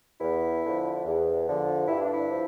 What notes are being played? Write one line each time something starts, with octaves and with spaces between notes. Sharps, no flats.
E2 E4
D3 F3
E2
D3 F3
G2 E4
D4
E4
F3